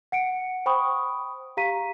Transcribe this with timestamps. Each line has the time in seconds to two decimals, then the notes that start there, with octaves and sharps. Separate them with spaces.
0.12 F#5 C#7 D7
0.66 C5 G5 B5 C#6 D#6
1.57 G4 F5 A#5 B6 D#7